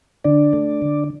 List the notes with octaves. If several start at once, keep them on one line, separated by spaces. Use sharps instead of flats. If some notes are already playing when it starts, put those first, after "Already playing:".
D3 D4 D5
A3
D3